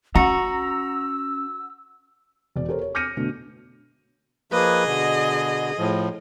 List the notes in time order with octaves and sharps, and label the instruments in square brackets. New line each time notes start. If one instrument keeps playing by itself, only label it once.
[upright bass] C#4 [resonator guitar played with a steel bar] F#4 [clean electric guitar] A#5 [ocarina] E6
[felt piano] E1 D5
G4 A4 A#4 C5 C#5
C#5
D6 F6 G6 A#6 C#7 D#7
B2 D3 A3
[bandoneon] F3 A#3 B4 [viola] G#4 D#5
[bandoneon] B2 D3
A2 F3